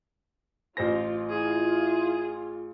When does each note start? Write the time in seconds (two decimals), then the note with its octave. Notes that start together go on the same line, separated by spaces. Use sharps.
0.77 A1 F4 C5 A#6
1.29 E4 F4 G#4